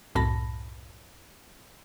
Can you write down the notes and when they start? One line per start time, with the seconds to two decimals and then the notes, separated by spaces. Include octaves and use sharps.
0.15 C2 F#2 A2 A5 B5 A#6